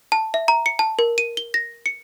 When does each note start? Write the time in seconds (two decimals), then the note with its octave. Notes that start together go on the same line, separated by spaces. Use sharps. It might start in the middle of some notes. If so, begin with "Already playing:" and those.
0.12 A5
0.34 E5
0.48 A#5
0.66 C#7
0.79 A5
0.99 A#4
1.18 D#7
1.37 G7
1.54 A#6
1.86 C#7